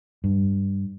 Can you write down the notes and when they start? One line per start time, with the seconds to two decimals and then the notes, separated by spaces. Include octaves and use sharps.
0.24 G2